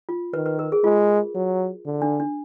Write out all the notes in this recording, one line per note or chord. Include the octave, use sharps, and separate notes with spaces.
F4
D#3 B4
B4
A#4
G#4
G#3 F4
F#3
D3
D4
D4